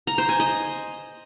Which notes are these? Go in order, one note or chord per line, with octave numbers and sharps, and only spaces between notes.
A#5
C5
G#5
D#5